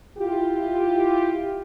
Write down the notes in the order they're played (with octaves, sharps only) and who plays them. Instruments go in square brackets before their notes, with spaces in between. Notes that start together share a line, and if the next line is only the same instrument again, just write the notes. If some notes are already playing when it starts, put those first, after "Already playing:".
[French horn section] E4 F4 G4